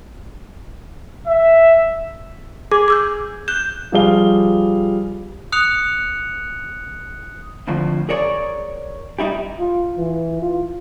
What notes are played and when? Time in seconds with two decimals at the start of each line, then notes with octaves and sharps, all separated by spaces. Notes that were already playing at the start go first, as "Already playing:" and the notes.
1.28 E5
2.72 G#4 D6
2.88 D6 E6 G6
3.48 F#6 G6 E7
3.92 F3 G3 G#4 F5 G7
5.52 D#6 F#6 C#7 F7
7.67 F2 A2 D3 F3
8.09 G#4 A#4 C#5 D5
9.19 G3 D#4 E4 G4
9.59 F4
9.97 E3
10.42 F4